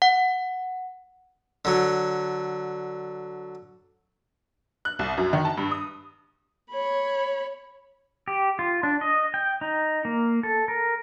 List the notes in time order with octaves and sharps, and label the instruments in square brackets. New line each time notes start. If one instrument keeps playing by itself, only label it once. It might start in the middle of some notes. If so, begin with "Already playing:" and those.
[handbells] F#5
[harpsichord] D3 F#3
[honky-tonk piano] F#6
C2
F#2
D#3
A5
G2
D#6
[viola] C#5 B5
[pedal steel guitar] G4
F4
D4
D#5
G5
D#4
A#3
A4
A#4